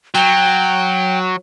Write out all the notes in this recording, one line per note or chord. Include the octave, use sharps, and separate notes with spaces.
F#3 G5